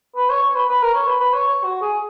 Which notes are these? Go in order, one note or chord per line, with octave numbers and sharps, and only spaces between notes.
B4
C#5
C#5
B4
B4
A#4
C#5
B4
B4
C#5
C#5
F#4
G#4